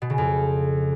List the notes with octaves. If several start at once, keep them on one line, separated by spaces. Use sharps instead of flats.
B2
C#3
F2